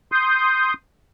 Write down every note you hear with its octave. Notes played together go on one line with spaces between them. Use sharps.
C6 D#6 G6